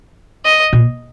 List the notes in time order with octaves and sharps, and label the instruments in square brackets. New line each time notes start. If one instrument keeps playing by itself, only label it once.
[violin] D#5
[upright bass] A#2